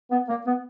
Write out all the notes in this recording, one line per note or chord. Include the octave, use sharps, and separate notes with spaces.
B3
A#3
B3